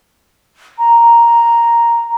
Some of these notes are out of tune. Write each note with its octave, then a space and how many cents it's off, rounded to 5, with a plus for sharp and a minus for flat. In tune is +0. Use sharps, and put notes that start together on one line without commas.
A#5 +0